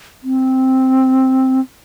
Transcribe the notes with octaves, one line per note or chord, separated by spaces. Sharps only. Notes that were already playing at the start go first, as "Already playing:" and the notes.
C4